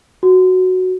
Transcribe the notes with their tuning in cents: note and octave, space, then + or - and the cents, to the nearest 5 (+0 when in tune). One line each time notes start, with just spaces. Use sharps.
F#4 +0